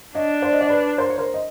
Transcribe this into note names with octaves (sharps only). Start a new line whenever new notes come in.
D4 C#5 D#5
C5 D5
D#5
D5
B4 C#5
A#4 C5
C#5
A#4 C5
D#5